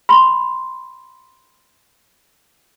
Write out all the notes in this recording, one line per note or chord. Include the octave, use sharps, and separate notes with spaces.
B5 C6